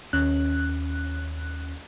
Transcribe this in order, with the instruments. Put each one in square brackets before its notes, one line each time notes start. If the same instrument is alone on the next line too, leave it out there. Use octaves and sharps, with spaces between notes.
[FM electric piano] D#2 C#4 F#6